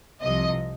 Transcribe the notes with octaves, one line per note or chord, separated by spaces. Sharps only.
C2 C3 F3 D#5